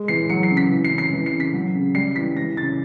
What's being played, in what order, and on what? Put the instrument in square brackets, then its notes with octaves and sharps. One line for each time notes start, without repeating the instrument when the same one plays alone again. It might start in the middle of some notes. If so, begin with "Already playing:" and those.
Already playing: [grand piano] G#3
E3 C7
F#3 C#7
C7
C#3
B6
E3
C7
C#3
C7
E3
C7
C#3
B6
F#3
C#3
G3 C7
E3 B6
E3 A#6
C#3 A6